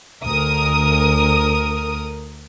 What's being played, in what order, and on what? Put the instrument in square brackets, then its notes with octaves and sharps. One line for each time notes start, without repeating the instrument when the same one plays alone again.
[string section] D2 A#4 D#6